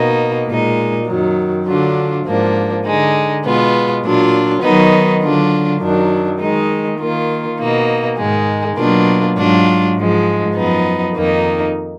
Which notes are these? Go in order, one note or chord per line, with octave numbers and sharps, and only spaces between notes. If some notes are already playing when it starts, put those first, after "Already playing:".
Already playing: B2 A#3 D#4
A#2 G#3 D#4
F#2 D#3 F#3
D3 F#3 D4 F4
G#2 F3 A#3 D4
D3 G#3 D#4
B2 G#3 B3 F4
A#2 F#3 D4 F4
D#3 F#3 B3 D#4
D3 F#3 D4 F4
F#2 D#3 F#3 D4
D#3 G#3 D#4
D#3 A#3 F4
B2 A#3 D#4
G#2 D#3 G#3
B2 F#3 A#3 D4 F4
G#2 F#3 D4 F4
G#2 F3 G#3
F#2 F3 B3 D#4
F2 D#3 A#3 D#4